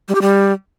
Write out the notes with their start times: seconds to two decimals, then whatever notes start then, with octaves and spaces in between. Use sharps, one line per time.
0.09 G3
0.15 G4
0.22 G3